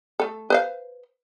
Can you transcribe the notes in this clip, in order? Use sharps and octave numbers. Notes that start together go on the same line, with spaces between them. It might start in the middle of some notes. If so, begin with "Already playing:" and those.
A3 A4
B4 C5 F5